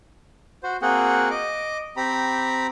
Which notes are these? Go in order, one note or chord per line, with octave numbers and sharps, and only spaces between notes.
F#4 C5
A#3 C4 F#4 G#4 F#5 G5
D#5 D6
C4 G4 A#5 B5